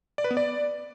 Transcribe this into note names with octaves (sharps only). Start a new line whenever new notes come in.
D5
B4
B3
D5